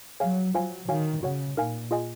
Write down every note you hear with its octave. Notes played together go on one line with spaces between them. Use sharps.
F#3 G#4 C#5 F5 G#5
F#3 F4 C5 F5 G#5
D#3 F#4 C#5 F5 G#5
C#3 F#4 C#5 F#5
A#2 D#4 A#4 F5 G#5
F4 G#4 D#5 G#5